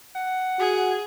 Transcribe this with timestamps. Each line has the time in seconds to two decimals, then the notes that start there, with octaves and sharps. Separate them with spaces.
0.15 F#5
0.59 F#4 G#4